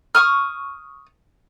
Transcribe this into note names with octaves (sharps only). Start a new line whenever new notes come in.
C#6 D#6 F6